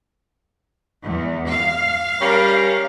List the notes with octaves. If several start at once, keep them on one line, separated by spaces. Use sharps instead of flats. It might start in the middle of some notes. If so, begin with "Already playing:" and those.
E2
F5
G3 C#4 A#4